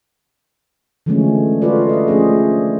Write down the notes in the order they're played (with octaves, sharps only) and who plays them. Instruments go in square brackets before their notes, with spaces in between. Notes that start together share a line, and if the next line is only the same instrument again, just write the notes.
[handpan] D3 E3 F3 G#3 A3 C#4
F4 F#4 A4 B4 D5
D#5 E5
F3 A3 C#4 D4 G#4 C5